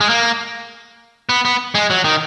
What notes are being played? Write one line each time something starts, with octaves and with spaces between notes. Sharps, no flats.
G#3
A#3
B3
B3
G#3
F#3
D#3